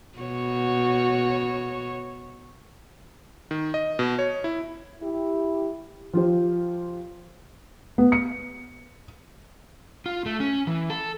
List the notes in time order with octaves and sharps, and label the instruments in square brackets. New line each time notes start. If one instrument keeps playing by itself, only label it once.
[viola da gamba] B2 F#4 C#5
[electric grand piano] D#3
D#5
B2
C#5
E4
[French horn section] E4 G4
[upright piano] F3 F4 G4 C5
[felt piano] B3
C#7
[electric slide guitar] F4
A3
C#4
E3
A4